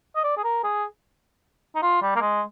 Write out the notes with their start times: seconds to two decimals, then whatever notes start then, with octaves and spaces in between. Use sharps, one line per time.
0.16 D#5
0.24 D5
0.37 G#4
0.44 A#4
0.64 G#4
1.75 D#4
1.82 F4
2.02 G3
2.16 A#3
2.22 G#3